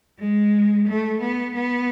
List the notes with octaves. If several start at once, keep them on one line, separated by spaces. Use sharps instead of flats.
G#3
A3
B3
B3